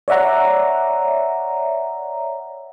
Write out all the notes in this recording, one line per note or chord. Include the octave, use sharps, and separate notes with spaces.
C#5 D5 E5 F#5 A#5